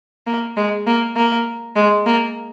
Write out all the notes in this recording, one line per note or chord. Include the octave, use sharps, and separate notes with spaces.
A#3
G#3
A#3
A#3
G#3
A#3